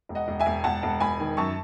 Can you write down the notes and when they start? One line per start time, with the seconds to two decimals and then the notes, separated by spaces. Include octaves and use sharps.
0.09 E1
0.15 D#5 F#5
0.28 E1
0.39 E5 G#5
0.46 E1
0.64 E1 F#5 A5
0.83 E1
1.00 E1 G#5 B5
1.20 D#3
1.37 F#2 A5 C#6